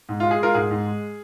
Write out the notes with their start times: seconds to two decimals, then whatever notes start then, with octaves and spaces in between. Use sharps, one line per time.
0.09 G#2
0.20 G#3 F4
0.31 G#4
0.39 G#3 F4 A#4
0.54 G#2 G#4
0.71 G#2
0.86 G#3